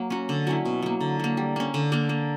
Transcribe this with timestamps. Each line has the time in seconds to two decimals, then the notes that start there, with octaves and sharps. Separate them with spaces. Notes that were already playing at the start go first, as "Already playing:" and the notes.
Already playing: F#3 A#3
0.10 C#4 F#4
0.29 D3
0.47 F#3 C#4 E4
0.65 B2
0.82 F#3 A#3
1.01 D3
1.20 F#3 A#3
1.37 G3
1.56 A#3 C#4
1.74 D3
1.92 A#3 D4 A#4
2.09 A#3